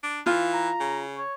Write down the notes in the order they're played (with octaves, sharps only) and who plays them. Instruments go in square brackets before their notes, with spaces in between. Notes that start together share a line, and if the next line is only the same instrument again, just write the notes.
[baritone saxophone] D4
[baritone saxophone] E3 [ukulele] F4
[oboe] A#5
[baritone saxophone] C#3
[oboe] C#5